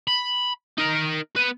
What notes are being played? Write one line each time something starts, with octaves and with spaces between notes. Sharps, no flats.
B5
D#4 A#4
B3 B4